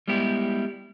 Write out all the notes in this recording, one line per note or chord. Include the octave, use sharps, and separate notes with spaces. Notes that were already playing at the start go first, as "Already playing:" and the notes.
G3 G#3 B3 E4 G4